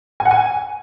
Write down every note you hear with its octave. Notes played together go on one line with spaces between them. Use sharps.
G#5
F#5
G#5